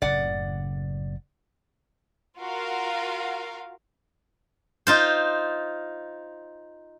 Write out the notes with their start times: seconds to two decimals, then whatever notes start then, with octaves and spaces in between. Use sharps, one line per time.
0.02 F#1 A2 C#3 D5 F#5
2.40 F4 F#4 A#4 F5
4.87 D#4 F4 C5